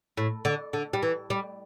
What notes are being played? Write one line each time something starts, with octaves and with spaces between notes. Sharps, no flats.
A2
D3
D3
G3
E3
G3